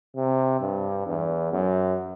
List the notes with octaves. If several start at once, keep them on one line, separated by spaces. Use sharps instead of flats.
C3
G2
E2
F#2